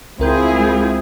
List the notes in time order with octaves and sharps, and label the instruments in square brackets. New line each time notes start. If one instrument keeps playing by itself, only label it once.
[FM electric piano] C#2 A#4 G6 [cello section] G#3 E4 G#4 [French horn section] C4 F4